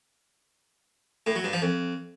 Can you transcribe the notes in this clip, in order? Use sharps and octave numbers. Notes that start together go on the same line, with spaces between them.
A2
F#3
G2
F3
F2